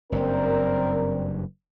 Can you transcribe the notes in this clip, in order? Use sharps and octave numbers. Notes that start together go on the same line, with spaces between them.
F#1 G2 C4 A#4 D5